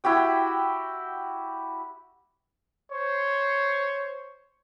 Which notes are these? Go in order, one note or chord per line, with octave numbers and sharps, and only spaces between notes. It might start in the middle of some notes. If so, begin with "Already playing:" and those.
E4 F#4 G4 G5
C5 C#5